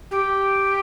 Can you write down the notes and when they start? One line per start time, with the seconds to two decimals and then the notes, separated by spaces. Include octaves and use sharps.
0.11 G4